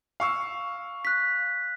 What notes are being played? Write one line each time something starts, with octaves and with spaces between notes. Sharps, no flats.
F5 C#6 E6
F#6 B6